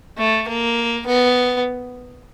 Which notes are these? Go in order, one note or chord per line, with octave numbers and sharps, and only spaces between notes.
A3
A#3
B3